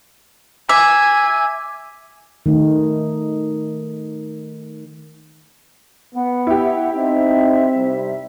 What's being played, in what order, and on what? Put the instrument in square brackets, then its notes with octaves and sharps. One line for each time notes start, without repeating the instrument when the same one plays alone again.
[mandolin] E5 [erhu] G#5 [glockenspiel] D6
[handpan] D#3 A3 D#4
[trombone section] B3 [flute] F#5
[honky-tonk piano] E4 G4
[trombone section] C4 [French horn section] D#4 [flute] E5
[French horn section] C3 G3